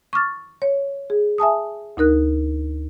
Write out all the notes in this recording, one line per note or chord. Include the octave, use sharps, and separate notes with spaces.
C#6 D6 F6 A6
C#5
G#4
E5 G#5 A5 D#6
D2 D#4 A#4 F#6